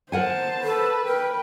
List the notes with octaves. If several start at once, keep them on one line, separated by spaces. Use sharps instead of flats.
A#4 C5 F#5 G#5 A5
A4 B4
A#4 G5